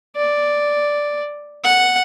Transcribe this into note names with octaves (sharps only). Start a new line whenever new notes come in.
D5
F#5